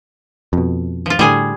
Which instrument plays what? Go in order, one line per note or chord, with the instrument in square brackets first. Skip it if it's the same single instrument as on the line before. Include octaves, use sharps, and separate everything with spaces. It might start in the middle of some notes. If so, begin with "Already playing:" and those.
[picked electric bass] F2 B2
[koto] F3 F4
[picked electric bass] A2 D3 [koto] G3 G#4 G#5